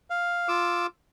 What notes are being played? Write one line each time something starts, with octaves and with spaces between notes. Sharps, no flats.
F5
F4 D6 E6